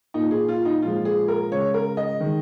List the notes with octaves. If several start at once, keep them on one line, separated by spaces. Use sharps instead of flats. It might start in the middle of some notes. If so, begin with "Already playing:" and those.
A#2 A#3 D#4
G#4
F4
D#4
A#2 F3 G#3 F4
G#4
A#4
C#3 G#3 C#5
A#4
D#5
D#3 G#3